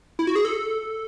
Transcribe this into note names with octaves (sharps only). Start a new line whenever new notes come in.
E4
F#4
G#4
A4